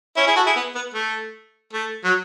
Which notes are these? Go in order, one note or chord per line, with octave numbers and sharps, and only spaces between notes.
C#4 E4
E4 G#4
F#4 A4
E4 G#4
B3
B3
A3
A3
F#3